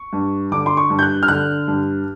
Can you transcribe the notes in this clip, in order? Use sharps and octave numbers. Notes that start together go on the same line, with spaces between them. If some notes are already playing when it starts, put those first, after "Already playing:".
Already playing: C#6
G2
D3 D6
C6
C#6
G2
G6
F#6
F6
D3 F#6
G2